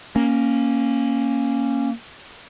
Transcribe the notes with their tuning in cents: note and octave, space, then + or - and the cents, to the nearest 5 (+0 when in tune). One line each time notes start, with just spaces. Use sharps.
A#3 +0 C#4 -10